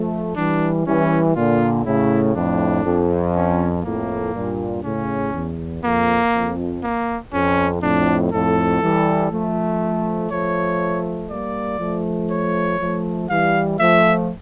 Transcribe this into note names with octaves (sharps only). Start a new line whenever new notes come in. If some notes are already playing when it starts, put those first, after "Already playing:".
Already playing: F3 A3
E3 G3 D4
E3 G3 C#4
A#2 D3 F4
A2 C#3 E4
F2 A2 D4
F2
C#4
F2 A2 A#3
G2 A#2
A2 C#3 C#4
E2
F2 A#3
F2
A#3
F2 C#4
F2 A2 D4
F2 A2 A4
E3 G3
F3 A3
F3 A3 C#5
G3 A#3 D5
F3 A3
C#5
F3 A3
E3 G3 F5
F3 A3 E5